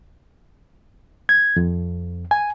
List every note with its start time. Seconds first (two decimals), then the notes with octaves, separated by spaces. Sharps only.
1.29 G#6
1.56 F2
2.31 G#5